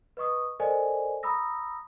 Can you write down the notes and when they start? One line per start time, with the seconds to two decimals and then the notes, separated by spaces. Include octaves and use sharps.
0.17 B4 D#5 C#6 D#6
0.60 A4 A#4 C5 D5 D#5 G#5
1.23 A#5 B5 D#6 E6 A#6